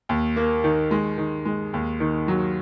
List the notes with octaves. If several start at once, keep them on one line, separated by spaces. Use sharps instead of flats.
D#2
A#3
D#3
G#3
D#3
G#3
D#2
D#3
F#3